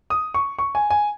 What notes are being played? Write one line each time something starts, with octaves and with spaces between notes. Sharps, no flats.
D#6
C#6
C#6
G#5
G#5